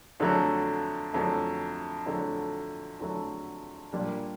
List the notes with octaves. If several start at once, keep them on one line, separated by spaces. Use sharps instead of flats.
F2 D3 F#3 A3
F2 D3 F#3 A3
F2 D3 F#3 A3
F2 D3 F#3 A3
A#2 G3 A#3 D4